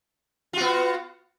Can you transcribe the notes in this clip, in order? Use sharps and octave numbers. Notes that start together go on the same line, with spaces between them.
B3 F4 F#4